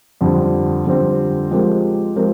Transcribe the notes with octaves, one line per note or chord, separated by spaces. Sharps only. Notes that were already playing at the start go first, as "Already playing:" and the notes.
F2 D3 G3 C4
F2 D3 G3 C4
F3 G#3 C4 G4 A#4
F3 G#3 C4 G4 A#4